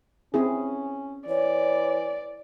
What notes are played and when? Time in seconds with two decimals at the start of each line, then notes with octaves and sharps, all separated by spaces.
0.34 C4 C#4 E4 G#4
1.28 E3 C#5 D5